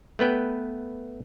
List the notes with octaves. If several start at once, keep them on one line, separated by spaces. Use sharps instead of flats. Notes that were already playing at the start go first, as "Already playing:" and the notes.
A3 B3 B4 G5